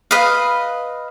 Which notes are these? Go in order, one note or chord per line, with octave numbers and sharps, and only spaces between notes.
B4 D#5 F5